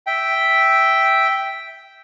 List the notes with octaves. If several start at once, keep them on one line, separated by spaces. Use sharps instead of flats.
E5 G5